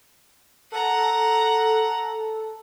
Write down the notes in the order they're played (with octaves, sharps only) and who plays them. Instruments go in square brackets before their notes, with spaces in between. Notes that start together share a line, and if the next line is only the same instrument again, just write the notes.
[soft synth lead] A4 [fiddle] F#5 A#5